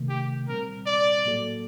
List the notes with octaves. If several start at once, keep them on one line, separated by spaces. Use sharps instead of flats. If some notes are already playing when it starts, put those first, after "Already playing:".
Already playing: C3 D#3 A3
G4
A#2 G3 C4 A#4
D5
A2 F#3 A#3 F#4 A4